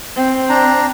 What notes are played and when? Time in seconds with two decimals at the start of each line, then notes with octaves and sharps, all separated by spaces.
0.16 C4
0.49 D4 A#5